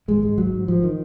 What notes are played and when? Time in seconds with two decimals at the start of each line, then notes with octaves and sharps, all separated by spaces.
0.08 G#1 G#3
0.23 G#2 G#3
0.38 G#1 F#3
0.53 G#2
0.68 G#1 F3
0.84 D#3